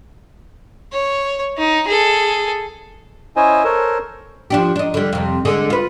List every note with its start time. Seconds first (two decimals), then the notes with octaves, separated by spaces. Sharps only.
0.92 C#5
1.58 D#4
1.88 G#4 A4
3.36 C#4 E4 C5 D#5 G#5
3.64 A4 A#4 C5 C#5
4.50 F3 D4 G4
4.76 D4 D#4
4.94 D3 G3
5.13 F2 C3
5.45 D3 G#3 G#4
5.70 F4 B4